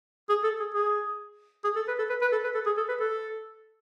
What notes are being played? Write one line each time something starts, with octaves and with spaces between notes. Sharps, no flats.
G#4
A4
G#4
G#4
G#4
A4
B4
A4
B4
B4
A4
B4
A4
G#4
A4
B4
A4